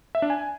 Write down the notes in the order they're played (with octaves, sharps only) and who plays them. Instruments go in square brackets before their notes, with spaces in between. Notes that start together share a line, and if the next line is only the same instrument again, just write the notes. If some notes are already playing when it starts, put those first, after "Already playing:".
[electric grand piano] E5
D4
G#5